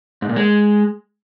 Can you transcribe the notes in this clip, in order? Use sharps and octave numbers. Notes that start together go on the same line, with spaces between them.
G#2
A#2
G#3